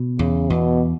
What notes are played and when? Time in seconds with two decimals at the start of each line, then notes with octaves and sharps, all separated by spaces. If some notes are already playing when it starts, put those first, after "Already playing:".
Already playing: B2
0.19 E2 C#3
0.50 E2 B2